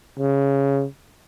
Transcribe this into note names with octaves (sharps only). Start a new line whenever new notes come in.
C#3